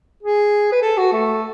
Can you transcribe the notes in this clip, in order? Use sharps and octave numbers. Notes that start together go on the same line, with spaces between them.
G#4
B4
A4
F#4
A3